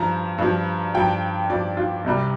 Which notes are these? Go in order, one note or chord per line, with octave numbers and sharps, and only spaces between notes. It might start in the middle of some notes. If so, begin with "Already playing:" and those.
Already playing: G2 F3 A#5
G2 F3
G2 F3 G5
G2 F3 D5
F4
C2 C3 G3